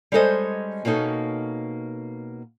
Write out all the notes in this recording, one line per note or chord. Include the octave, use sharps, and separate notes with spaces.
G3 G#3 C#4 A4 C5 D#5
B2 A#3 C#4 D#4 A4